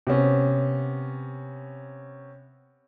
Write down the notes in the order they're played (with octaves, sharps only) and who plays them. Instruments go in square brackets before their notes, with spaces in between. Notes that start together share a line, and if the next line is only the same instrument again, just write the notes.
[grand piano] C3 B3 C#4